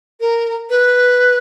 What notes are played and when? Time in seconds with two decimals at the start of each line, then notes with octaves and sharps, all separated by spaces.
0.21 A#4
0.70 B4